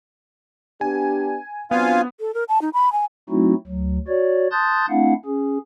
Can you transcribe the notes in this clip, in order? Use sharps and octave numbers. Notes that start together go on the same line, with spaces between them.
B3 D4 G4 G#5
F#3 B3 C4 D4 F4 F5 G#5
A4
A#4
A5
D#4
B5
G#5
F#3 A3 C4 D#4 E4 F#4
D2 F#3
F#4 C#5 D5
A5 C6 D#6 F#6 G6 A6
A3 C4 D4 E4 F5 F#5
C#4 G#4